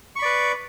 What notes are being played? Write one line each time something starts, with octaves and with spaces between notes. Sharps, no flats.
B4 D5 B5 C#6